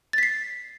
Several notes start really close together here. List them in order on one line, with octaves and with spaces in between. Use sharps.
A6 B6 C7